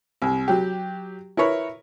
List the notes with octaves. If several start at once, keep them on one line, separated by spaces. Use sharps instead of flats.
C2
F#3 G4
E4 A#4 B4 C#5